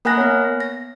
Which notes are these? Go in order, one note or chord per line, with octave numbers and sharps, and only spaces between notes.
A#3 A#4 F#5 G#5 F#6 A#6
B3 C#5
A#6